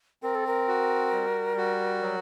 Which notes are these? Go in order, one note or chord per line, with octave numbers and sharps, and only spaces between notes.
C4 A#4
A4
A#4
F#4
G3
F#4
F#3